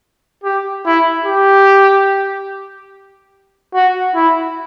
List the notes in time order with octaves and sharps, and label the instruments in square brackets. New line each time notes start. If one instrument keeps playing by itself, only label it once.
[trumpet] G4
E4
G4
F#4
E4